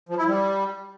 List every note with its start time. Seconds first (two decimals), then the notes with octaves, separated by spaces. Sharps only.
0.09 F3
0.18 E4
0.27 G3